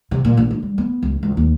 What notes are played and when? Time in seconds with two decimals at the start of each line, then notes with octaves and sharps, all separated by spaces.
0.11 C3
0.25 A#2
0.37 A#1
0.51 D3
0.63 G3
0.78 B3
1.03 C#2
1.23 C#2
1.37 D#2